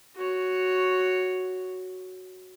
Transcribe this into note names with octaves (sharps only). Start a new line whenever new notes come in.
F#4 C#5